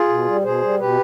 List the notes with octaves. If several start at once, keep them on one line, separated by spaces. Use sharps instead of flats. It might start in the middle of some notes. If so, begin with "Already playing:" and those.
Already playing: F4 G#4
B2
G3
B2 G#4 C5
G3
B2 G4 B4